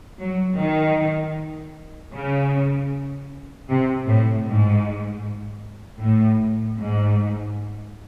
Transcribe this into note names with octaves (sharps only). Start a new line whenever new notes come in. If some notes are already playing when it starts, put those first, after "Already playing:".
F#3
D#3
C#3
C3
A2
G#2
A2
G#2